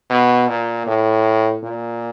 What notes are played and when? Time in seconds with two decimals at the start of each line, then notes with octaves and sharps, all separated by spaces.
0.10 B2
0.48 A#2
0.87 A2
1.63 A#2